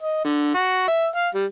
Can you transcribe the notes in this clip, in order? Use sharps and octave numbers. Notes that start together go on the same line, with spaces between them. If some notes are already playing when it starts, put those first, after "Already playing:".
D#5
D3
F#4
E5
F5
G3